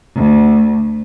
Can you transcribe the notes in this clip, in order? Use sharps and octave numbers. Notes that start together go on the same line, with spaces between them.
D2